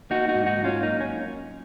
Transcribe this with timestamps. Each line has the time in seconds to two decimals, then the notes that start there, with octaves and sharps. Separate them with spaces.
0.10 A#3 D#4 F#4
0.29 D#4 F#4
0.34 G#2
0.46 D#4 F#4
0.58 F#3
0.64 C#4 F4
0.83 A#3 D#4
1.01 C#4